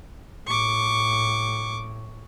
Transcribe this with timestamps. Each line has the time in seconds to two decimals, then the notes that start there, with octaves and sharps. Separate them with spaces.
0.47 A2 C#6 D6